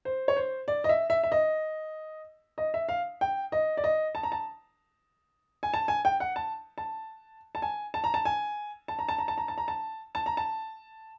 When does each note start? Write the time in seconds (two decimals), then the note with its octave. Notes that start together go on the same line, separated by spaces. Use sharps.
0.05 C5
0.28 C#5
0.37 C5
0.68 D5
0.84 D#5
0.89 E5
1.10 E5
1.23 E5
1.32 D#5
2.58 D#5
2.74 E5
2.89 F5
3.21 G5
3.52 D#5
3.77 D5
3.84 D#5
4.15 A5
4.23 A#5
4.32 A5
5.63 G#5
5.74 A5
5.88 G#5
6.05 G5
6.20 F#5
6.36 A5
6.78 A5
7.55 A5
7.62 G#5
7.94 A5
8.04 A#5
8.14 A5
8.25 G#5
8.88 A5
8.99 A#5
9.09 A5
9.18 A#5
9.28 A5
9.38 A#5
9.48 A5
9.58 A#5
9.68 A5
10.15 A5
10.26 A#5
10.37 A5